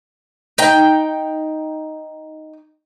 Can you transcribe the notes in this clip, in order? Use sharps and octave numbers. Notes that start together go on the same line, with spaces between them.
D#4 G5